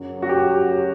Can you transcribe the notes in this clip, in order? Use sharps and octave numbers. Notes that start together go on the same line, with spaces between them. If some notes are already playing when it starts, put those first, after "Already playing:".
Already playing: F#2 C#3 F#3 C#4
F#4
G4